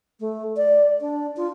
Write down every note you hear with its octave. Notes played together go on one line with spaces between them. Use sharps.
A3
D5
D4
F4